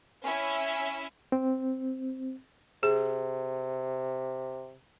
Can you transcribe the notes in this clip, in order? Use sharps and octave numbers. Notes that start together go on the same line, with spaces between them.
C#4 E4 E5 G#5
C4
C3 G#4